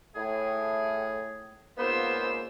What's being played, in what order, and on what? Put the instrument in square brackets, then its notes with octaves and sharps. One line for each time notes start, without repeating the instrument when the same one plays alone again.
[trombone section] A2 [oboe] G#4
[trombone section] G#2 C#3 A#3 [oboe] B3 [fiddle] F4 E6 [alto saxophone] C5